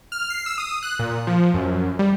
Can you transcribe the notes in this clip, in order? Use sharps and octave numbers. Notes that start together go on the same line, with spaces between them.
F6
C7
E6
D#6
F#6
A#2
F3
F#2
G3